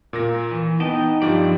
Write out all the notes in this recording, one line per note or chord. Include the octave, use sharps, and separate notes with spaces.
A#2 A#3 A#6
E3
B3 D#4 D#5 G5 A5
G2 F3 C4 G4 D5